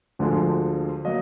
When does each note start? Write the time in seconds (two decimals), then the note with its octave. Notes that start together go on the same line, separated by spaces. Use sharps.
0.19 D2 D3 F3 G#3
1.05 F#3 A#3 D#5